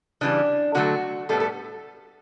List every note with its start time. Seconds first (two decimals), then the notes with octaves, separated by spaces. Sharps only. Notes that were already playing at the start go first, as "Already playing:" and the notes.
0.21 C#3 E3 G3 D4
0.75 D3 F#3 A3 F#4
1.29 A2 G3 B3 A4
1.40 A4